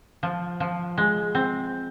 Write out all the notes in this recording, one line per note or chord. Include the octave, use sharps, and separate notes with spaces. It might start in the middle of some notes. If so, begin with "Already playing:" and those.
F3
F3
G#3
C4